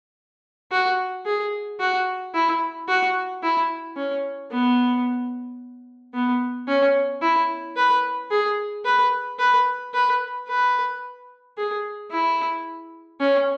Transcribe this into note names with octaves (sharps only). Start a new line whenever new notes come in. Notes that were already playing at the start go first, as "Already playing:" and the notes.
F#4
G#4
F#4
E4
F#4
E4
C#4
B3
B3
C#4
E4
B4
G#4
B4
B4
B4
B4
G#4
E4
C#4